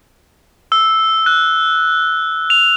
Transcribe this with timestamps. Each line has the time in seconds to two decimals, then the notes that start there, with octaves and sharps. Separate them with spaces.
0.72 E6
1.26 F#6
2.50 F7